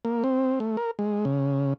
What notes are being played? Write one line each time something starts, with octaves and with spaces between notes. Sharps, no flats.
A#3
C4
A3
A#4
G#3
C#3